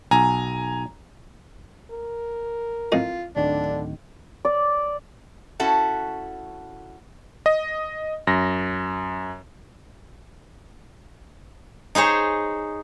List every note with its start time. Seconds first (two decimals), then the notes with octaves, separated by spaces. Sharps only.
0.11 B1 G#5 A#5
1.91 A#4
2.92 F2 A2 F4 D#5
3.36 D1 D3 D#3 D4
4.45 D5
5.60 C#4 E4 F#4 A4
7.46 D#5
8.27 F#2 A#6
11.95 D#4 G#4 C5 C#5